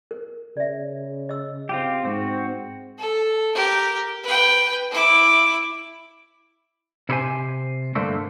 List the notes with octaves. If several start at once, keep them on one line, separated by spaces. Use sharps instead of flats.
A#4
C#3 D5 E5
D#5 E6
C4 F4 G4
G#2 C4 F#4
A4
G4 A#4
B4 G5
E4 D6
C3 E4 G4 B4 C5 G#5
G2 D3 A3 A#3 C4